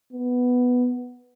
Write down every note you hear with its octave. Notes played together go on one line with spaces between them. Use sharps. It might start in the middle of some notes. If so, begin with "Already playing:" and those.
B3